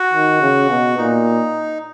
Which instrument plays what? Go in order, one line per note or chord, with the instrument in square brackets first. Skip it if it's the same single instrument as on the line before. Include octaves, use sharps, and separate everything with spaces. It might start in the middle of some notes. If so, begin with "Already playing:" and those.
Already playing: [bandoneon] F#4
[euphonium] D#3
C#3
B2
[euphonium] A#2 [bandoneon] D#4